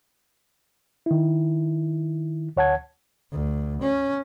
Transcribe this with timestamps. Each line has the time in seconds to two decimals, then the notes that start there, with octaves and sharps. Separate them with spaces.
1.06 D#3 E4
2.57 D2 C#5 F#5 A5 G#6
3.32 D2
3.81 C#4